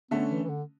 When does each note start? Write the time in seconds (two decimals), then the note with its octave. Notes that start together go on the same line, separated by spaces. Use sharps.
0.11 D3 A3 B3 C#4
0.31 E3
0.44 E3
0.49 D3